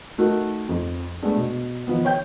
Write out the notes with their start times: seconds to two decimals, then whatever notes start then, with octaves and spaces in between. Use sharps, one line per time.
0.18 A3 D#4 F#4 A#4
0.69 F2
1.22 G#3 A3 B3 D4
1.36 B2
1.87 D#3 F3 B3
2.05 C#5 G5 G6